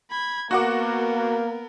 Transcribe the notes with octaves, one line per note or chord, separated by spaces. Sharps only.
B5 G#6
A#3 B3 F#4 A#4 F#5 D6